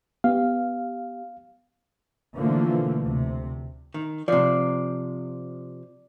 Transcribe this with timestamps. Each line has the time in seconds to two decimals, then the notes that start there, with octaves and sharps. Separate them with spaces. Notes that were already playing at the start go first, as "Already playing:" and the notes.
0.24 B3 G4 F5
2.35 B2 D3 E3 F3 A3 A#3
3.01 D2 C3
3.94 D#3
4.28 C3 F3 D5 F#6 C7